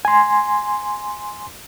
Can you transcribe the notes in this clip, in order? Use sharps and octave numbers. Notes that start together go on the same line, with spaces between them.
G#5 C6